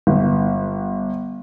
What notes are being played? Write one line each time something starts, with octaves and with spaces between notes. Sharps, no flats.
G1